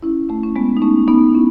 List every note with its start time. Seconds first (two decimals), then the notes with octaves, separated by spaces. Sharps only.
0.02 C#4 E4
0.29 A3 C#4
0.44 C#4
0.56 G#3 B3
0.77 D#4
0.82 A3 C#4
1.08 B3 D#4
1.34 C#4 E4